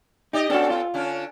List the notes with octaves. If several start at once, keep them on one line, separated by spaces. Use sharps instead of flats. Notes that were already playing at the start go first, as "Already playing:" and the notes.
D#4 G4 D5 D#5
B3 C#4 D4 F#4 A4
F4
D3 C#4 D4